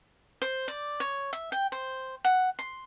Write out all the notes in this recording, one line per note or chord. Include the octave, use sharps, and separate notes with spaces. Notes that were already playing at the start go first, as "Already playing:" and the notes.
C5
D5
C#5
E5
G5
C5
F#5
C6